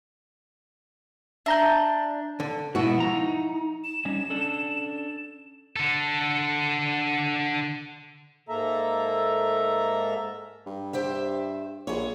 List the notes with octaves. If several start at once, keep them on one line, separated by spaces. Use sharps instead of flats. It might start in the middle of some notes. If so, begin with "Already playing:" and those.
D4 E5 A#5 G6
D3
G#2 B2 E4 F#4
F3 A#5
D#4
E7
G3 C#4 D#4
C#4 D4 A4
D3 A4
G#2 A#3 A4 E5 A#5
G2
G4 C5 E5
A#1 G#4 C#5